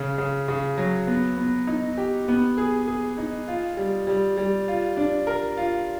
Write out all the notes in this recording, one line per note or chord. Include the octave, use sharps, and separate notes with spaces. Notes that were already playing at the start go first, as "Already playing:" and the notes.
Already playing: C#3
C#3
C#3
F#3
B3
B3
D#4
G4
B3
G#4
G#4
D#4
F4
G3
G3
G3
F4
D4
A#4
F4